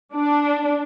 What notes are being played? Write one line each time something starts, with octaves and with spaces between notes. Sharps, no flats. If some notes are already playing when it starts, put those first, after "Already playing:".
D4